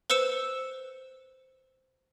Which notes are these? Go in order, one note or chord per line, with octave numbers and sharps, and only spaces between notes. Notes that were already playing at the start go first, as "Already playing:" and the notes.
B4 C5 E6 C#7 E7